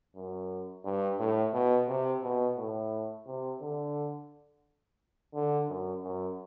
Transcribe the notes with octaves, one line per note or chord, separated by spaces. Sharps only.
F#2
G2
A2
B2
C3
B2
A2
C3
D3
D3
F#2
F#2